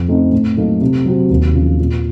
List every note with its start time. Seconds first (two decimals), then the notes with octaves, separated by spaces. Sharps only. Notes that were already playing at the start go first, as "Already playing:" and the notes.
Already playing: F2
0.08 C#3 A3 C4 D#4
0.32 A2
0.57 F#3 A#3 D#4 A4
0.81 C3
1.05 F#3 C4 F#4
1.30 D#2
1.55 C#3 F3
1.79 A#2